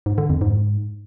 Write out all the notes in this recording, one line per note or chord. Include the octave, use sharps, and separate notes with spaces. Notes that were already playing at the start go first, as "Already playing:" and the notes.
G#2
D3
F2
G#2